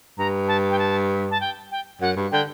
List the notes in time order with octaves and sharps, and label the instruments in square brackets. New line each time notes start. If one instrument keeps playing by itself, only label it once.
[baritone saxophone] G2 [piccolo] A#5
[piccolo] A5
G5
A5
A5
G5
G5
[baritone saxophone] F#2 [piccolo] F#5
[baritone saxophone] G2
[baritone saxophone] D3 [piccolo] G5